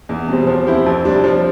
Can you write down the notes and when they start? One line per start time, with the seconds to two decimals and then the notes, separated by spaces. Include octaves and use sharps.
0.09 E2
0.28 B2 G3 C4
0.47 F3
0.67 C4 E4 G4
0.86 F2
1.05 C3 G3 D4
1.24 F3